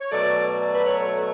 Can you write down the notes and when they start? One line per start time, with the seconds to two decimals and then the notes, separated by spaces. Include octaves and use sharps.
0.01 C#5
0.11 B2 F#3 A3 D5
0.48 D5
0.74 B4
0.85 C#5